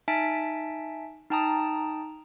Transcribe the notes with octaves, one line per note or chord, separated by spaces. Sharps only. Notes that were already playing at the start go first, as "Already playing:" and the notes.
D#4 E5 G#5 A5 B6 D7
D#4 G5 A5 A#5 D#6